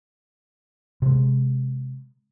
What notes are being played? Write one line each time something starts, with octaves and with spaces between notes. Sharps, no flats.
C3 G#3